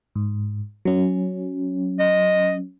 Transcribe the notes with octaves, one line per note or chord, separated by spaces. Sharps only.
G#2
F#3 C#4
D#5